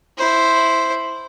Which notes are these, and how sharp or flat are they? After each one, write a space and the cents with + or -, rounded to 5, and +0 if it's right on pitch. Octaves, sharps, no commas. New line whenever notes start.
E4 +0 C5 +0